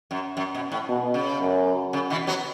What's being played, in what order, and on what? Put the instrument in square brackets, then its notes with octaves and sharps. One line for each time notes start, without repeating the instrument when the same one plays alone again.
[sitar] F#2
F#2
B2
A2
[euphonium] B2
[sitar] C#3
[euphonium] F#2
[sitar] C#3
B2 E3
F#3 B3